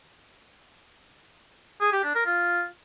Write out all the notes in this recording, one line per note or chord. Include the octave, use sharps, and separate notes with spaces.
G#4
G4
D4
A#4
F4